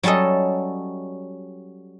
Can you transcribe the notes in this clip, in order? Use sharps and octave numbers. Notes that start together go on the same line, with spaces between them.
F#3 G3 C#4 A4 D#5